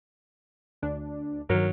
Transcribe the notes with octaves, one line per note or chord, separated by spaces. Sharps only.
D2 D4
G2 D#3 F#3 A#4 F6